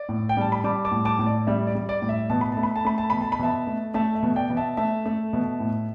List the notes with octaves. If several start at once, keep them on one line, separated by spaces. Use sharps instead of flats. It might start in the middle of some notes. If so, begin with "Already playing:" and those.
Already playing: D5
A2
G5
G3 A5
B5
G3 A5 D6
A5 D6
A2
A5 D6
A2
D5
G3 E5
D5
G3
D5
A2
E5
B2 A5
B5
A3 A5
B5
A5
A3 B5
A5
B2 B5
A5
B5
B2 E5 A5
A3
A3 E5 A5
E5
B2
D5 G5
B2
E5 A5
A3 E5 A5
A3
B2
A2